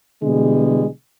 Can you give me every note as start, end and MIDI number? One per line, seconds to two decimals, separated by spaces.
0.22 0.87 47
0.22 0.87 50
0.22 0.87 52
0.22 0.87 55
0.22 0.87 56
0.22 0.87 68